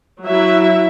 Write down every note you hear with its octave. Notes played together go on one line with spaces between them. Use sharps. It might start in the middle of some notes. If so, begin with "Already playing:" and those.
F#3 E4 E5